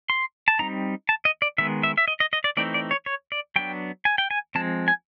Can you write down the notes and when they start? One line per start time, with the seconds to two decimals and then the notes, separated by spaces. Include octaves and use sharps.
0.10 C6
0.48 A5
0.59 G3 C4 D#4 A#5
1.09 A5
1.25 D#5
1.42 D5
1.58 D#3 G#3 B3 E5
1.83 E5
1.98 E5
2.08 D#5
2.20 D#5
2.33 D#5
2.44 D5
2.57 E3 A3 C4 D#4 D5
2.74 D5
2.91 C#5
3.06 C#5
3.32 D5
3.56 F#3 B3 D4 G5
4.05 G#5
4.18 G5
4.31 G#5
4.55 F3 G#3 C4 A5
4.88 G#5